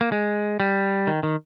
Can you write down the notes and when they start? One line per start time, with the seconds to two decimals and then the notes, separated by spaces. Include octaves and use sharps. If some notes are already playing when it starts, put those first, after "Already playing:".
0.01 A#3
0.12 G#3
0.60 G3
1.07 D#3
1.23 D#3